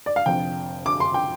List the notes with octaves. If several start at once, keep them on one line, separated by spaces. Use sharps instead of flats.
D5
F5
F1 F2 D3 G5
D6
C6
G5